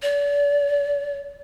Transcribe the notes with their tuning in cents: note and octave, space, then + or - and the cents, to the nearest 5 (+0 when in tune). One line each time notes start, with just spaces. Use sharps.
D5 -40